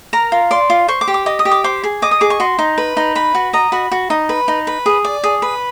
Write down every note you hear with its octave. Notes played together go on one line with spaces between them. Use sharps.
A#4 A#5
F4
D5 C6
F4
C5 C#6
D6
G4
D6
D#5 D6
D#6
G4
D6
C5 D6
G#4
D#5 D6
D#6
G#4 D6
C#6
F#4 C6
D#4
B4
D#4
B4 B5
F#4
D#5 A#5
F#4 B5
F#4
D#4
B4
D#4
B4
G#4
D5
G#4
B4